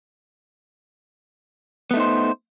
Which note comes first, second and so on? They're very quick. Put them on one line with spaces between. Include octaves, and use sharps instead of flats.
B3 A3 D#4 C5